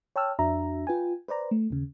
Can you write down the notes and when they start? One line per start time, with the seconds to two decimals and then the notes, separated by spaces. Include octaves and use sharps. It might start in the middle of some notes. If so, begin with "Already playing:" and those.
0.16 C#5 G5 A5 E6 F6
0.39 F2 D4 F#4 E5 A#5
0.87 F4 B4 G5 G#5
1.28 B4 C5 D5 A#5
1.51 A3
1.70 D#2 C#3